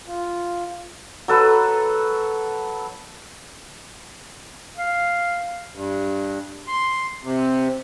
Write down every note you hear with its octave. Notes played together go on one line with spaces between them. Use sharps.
F4
F#3 A4 B4
F5
G2
C6
C3